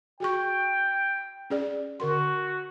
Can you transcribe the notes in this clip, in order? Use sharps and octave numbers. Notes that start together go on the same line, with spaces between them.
F#4 G#4 G5 C#6
C#4 G#4 D5
D3 F#4 A#4 C6